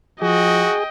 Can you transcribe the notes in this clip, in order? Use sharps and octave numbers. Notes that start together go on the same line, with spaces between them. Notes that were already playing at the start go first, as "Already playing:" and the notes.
F3 F#4 G#4 D#5 G5